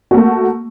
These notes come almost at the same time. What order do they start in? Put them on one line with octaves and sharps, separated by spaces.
F#4 A#3 A3